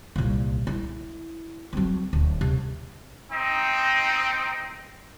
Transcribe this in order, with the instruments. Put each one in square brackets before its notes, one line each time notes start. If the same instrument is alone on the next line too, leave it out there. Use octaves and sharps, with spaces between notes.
[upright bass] C2 A#2
E4
F#3 C4
D1
C3
[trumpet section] C4 D#4